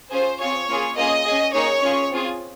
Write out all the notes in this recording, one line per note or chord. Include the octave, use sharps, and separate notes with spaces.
C#4 F4 G#4 C5
C4 F4 G#4 C#5
A#3 C#4 F4 G#4
A#3 C#4 F4 G#4 D#5
C#4 G#4
A#3 D#4 G#4 C#5
C#4 F4 G#4
C4 F4 G#4